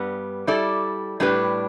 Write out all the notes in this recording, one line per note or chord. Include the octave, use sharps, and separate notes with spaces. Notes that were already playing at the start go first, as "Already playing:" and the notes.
Already playing: G2 G3 B3
G3 E4 A4 D5
A2 G3 D4 G4 B4